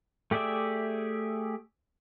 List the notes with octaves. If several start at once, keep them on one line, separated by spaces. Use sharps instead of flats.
A3 G4 G#4 D5 E5